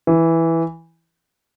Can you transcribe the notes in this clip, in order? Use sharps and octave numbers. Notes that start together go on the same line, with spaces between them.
E3